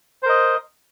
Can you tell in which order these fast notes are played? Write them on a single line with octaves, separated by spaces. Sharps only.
C5 A#4 D#5